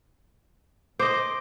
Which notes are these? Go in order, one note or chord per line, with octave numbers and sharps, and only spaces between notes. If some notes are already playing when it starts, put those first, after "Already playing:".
C5 D#5 D6